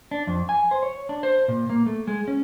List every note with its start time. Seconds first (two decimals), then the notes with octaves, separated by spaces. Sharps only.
0.11 D4
0.27 F2
0.49 G#5
0.71 C5
0.83 C#5
1.09 D4
1.23 C5
1.48 A#2
1.70 A#3
1.86 A3
2.07 G#3
2.28 C#4